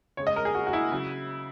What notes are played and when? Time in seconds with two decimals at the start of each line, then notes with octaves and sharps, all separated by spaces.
0.17 C#3 G#3 C#5
0.27 D#5
0.36 A#4
0.45 G#4
0.55 F#4
0.67 F#4
0.73 E4
0.92 C#3 F#3